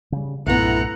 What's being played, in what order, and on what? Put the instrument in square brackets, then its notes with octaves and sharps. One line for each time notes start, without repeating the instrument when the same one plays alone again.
[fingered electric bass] C#3 G3
[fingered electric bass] B1 G2 A#2 [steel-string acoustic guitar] A3 B3 [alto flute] E4 [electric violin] F#5 A#5